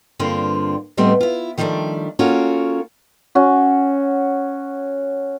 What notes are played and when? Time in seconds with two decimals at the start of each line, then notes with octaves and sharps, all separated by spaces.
0.19 G2 D3 A#3 C4 F4
0.97 A2 G3 A3 B3 C4 D#5
1.21 E4 F4
1.58 D#3 F3 G3 A3 D4
2.19 A#3 C#4 F4 F#4 A4 A#4
3.35 C#4 F#4